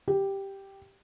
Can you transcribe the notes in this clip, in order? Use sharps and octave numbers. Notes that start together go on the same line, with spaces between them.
G4